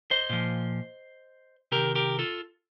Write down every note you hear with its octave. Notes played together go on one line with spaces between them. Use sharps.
C5 D#5
A#2 F3
C3 D#3 G4 A#4
G4 A#4
F4 A4